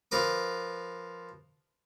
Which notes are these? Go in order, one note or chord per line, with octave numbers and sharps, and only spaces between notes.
F3 A#4 B4 D6